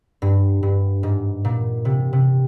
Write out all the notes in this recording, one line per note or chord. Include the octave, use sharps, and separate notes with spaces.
G2
G2
G#2
A#2
C3
C3